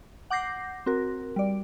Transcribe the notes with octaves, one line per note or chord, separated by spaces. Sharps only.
F#5 D6 G6 A#6 C7
C4 F#4 A#4
G3 D5